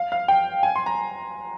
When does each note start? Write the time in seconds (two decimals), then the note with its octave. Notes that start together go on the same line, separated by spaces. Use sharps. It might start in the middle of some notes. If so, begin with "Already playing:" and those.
Already playing: F5
0.12 F5
0.28 G5
0.63 G#5
0.76 C6
0.86 A#5